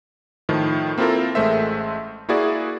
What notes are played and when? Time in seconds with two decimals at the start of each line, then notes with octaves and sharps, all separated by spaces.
0.49 A2 D#3 F3
0.98 A#3 C4 E4 F4 A4 A#4
1.35 A1 G#3 A3 C5 E5
2.29 A#3 E4 F#4 G#4 D5